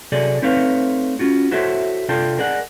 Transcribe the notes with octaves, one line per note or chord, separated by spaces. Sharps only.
C3 F#3 G#4 A4 D5
A3 C4 D#4 B4 C#5 F5
C#4 F4 F#4
E4 F#4 A4 C5 C#5 E5
C3 D4 F4 A4 G5
G#4 A#4 D5 D#5 F#5